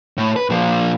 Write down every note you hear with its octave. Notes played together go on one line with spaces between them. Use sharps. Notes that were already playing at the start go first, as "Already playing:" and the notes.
A2
B4
A#2 F3